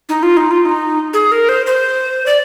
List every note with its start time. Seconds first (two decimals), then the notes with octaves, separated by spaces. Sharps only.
0.09 D#4
0.23 F4
0.37 D#4
0.51 F4
0.65 D#4
1.13 G#4
1.32 A#4
1.49 C5
1.66 C5
2.26 D5